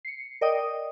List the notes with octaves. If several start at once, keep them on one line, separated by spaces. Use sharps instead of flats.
C7 C#7
A#4 D5 D#5 G5 D#6